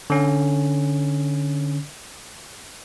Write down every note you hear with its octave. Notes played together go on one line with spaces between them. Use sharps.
D3 C#4